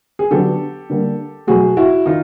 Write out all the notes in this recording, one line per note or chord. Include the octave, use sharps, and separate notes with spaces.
G#4
D3 F#3 B3 G4 A4
D3 G3 A#3
B2 F#3 A3 F#4 G#4
E4 F#4
D#3 D#4 F4